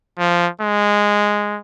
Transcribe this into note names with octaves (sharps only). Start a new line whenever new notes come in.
F3
G#3